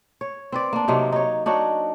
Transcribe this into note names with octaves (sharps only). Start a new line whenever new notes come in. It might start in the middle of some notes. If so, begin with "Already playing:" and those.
C#5
C4 B4 D5
A#3 D4
C3 F#3 A#3 D#4
D#4 C#5
D4 D#4 F#4 C#5